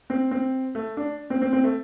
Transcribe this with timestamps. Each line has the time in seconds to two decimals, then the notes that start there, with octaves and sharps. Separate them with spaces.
0.10 C4
0.31 C4
0.75 A3
0.97 D4
1.30 C4
1.42 C4
1.53 C4
1.64 A3